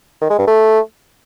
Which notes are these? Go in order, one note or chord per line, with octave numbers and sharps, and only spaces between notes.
D#3
G#3
G2
A3